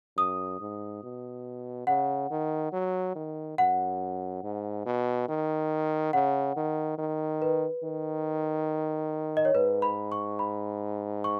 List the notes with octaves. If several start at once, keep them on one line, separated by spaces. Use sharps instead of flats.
F#2 D#6
G#2
B2
C#3 F#5
D#3
F#3
D#3
F#2 F#5
G#2
B2
D#3
C#3 F#5
D#3
D#3
B4
D#3
D#5
C#5
G#2 B4
B5
C#6
B5
C#6